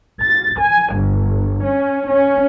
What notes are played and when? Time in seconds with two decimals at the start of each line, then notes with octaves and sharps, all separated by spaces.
0.23 A6
0.58 G#5
0.95 G1
1.63 C#4
2.09 C#4